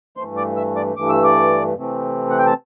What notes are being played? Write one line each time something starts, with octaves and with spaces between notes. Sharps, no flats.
G2 E3 A3 C5 C6
D5 D6
E5 E6
D5 D6
G2 E3 A3 D6
E6
D5 D6
C3 E3 A3 C4
F#5
G5
A5